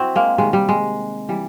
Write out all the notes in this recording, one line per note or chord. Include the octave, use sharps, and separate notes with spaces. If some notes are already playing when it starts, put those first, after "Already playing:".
Already playing: C4 E4 F#4
G#3 A#3
C3 D#3 G3 G#3
G3
G#3
E3 G3